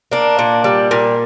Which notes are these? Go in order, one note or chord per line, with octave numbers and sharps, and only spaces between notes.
A#3 D4
A#2
G3
A#2